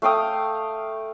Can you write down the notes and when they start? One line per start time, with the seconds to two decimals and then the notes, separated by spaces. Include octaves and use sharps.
0.02 A3 F5 G5 D#6